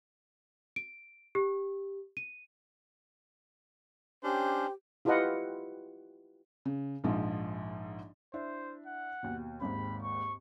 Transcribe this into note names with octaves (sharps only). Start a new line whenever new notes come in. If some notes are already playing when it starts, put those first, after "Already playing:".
D7
G4
D#7
C#4 D4 G4 C5
E4 F4 G4 B4 D#5 F#5
C#3
A#1 G#2 F3
D4 E4 C5 E5
F#5
D#2 B2
G#1 D#2 G#2 B5
C#6